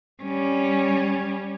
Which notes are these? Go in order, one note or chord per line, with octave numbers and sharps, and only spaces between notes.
G3 C#4